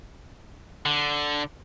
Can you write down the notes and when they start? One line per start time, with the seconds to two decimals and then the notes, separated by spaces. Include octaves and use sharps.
0.86 D3